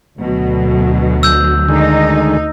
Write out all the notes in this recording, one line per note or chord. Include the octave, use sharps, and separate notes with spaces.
D2 B2 F#3
E6 G6
D3 D#3 G#3 D#4